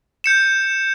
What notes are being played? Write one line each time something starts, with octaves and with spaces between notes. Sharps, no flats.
G6 C#7 E7